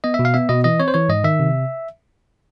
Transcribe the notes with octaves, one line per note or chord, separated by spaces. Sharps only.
B3 D#5
E5
B2
F5
B3 E5
B2 D#5
E3 D#5
C4 C#5
C5
E3 C#5
G#2 D#5
D#3 E5
C3